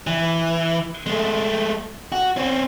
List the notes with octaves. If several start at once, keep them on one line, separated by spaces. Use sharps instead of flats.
E3
G#3 A3
F#4
C4 C#4